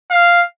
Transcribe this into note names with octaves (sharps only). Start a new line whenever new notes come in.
F5